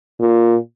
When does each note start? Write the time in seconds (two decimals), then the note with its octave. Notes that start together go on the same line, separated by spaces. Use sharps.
0.20 A#2